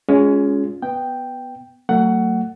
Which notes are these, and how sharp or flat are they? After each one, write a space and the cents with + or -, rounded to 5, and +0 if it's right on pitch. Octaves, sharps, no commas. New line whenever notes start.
G#3 +0 C#4 +20 F4 +25
B3 +0 G5 +0
F#3 +15 A3 +40 F#5 +15